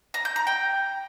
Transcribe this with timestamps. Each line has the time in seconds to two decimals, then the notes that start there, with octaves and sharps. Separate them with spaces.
0.14 A#5
0.25 G6
0.36 A#5
0.47 G5